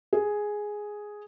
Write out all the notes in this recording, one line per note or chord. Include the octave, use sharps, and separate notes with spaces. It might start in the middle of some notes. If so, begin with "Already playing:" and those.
G#4